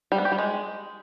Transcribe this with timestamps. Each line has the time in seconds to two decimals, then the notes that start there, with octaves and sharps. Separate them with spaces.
0.12 G3
0.18 B3
0.25 G4
0.32 G3
0.38 G#3